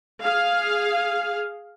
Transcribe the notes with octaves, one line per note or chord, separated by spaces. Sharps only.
G#4 F5